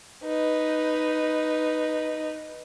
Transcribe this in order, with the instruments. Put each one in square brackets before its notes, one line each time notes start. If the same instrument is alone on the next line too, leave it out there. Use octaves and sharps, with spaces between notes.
[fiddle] D#4 B4